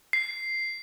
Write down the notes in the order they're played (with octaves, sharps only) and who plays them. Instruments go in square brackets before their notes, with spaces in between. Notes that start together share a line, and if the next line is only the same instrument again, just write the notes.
[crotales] C7